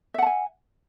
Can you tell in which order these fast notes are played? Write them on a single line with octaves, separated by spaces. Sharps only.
E5 F#5 A5 G#5